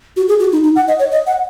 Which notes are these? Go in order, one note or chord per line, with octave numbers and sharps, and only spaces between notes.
F#4
G#4
F#4
D#4
D#4
F#5
D#5
C#5
D#5
F#5